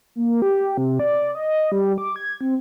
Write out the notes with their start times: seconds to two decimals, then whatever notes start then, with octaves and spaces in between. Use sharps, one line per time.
0.16 A#3
0.42 G4
0.77 C3
0.99 D5
1.35 D#5
1.72 G3
1.98 D6
2.16 G#6
2.41 C4